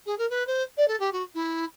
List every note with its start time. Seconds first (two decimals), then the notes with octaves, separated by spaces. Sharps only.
0.06 G#4
0.18 A#4
0.30 B4
0.47 C5
0.77 D5
0.88 A4
1.00 G4
1.12 F#4
1.35 E4